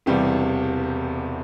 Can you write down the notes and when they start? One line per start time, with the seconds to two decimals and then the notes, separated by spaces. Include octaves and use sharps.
0.06 E1 E2 C3 G3 G4